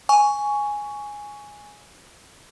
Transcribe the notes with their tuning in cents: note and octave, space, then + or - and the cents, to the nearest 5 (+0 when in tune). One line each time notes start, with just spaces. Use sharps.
G#5 +0 C#6 +15